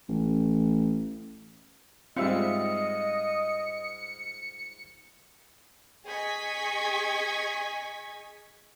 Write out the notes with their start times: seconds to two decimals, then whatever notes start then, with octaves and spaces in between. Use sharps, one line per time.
0.08 A1
2.16 G#2 G3 C4 F4 D#5 E5 C#7
6.07 G#4 D#5 C#6 G#6 B6